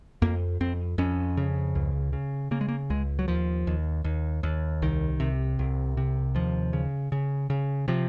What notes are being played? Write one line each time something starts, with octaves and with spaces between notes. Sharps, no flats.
F2 A#3
F2 C4
F2 C#4
C#3
C#2
C#3
C#3 A#3
G#3
A#3
C#2 G#3
F#3
D#2 F3
D#2
D#2
D#2
C2 D#3
C3
C2
C3
D#2 F3
C#3
C#3
C#3
C3 F3